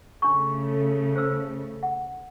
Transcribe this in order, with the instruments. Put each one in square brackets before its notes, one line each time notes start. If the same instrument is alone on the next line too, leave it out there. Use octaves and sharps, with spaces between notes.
[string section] C#3 A3 [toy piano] D4 C#6
[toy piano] C5 E6
F#5